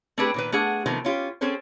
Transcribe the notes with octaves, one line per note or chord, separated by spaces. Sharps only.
A3 C4 D4 G4 G#4 B4
A#2 D#3 B4
A3 D4 G#4 F#5
C3 D#3 F3 A3 B3
C#4 F4 G4
C4 C#4 G#4 A4 C5